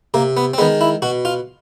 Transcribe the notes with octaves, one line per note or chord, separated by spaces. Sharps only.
C3 A#3
B3
C4
D#3 G#3 B3
E4
B2 F#4
F4